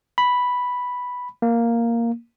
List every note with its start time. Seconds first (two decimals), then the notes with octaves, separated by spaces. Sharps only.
0.18 B5
1.42 A#3